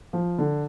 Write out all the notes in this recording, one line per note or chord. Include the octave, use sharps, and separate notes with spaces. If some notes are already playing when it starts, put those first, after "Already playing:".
F3
D3